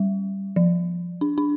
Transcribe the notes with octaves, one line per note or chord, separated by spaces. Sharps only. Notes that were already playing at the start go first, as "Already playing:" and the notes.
Already playing: G3
F3
D4
D4